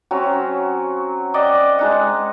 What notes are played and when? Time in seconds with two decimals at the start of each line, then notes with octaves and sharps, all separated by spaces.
0.11 F#3 C4 C#4 A#5
1.34 D5 D#5 F#5 G5
1.79 G#3 D#4 F#5